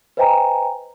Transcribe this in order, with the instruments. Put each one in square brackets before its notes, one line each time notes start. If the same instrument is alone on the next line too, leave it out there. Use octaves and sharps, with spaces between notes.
[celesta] B4 C5 D#5 G5 G#5 A#5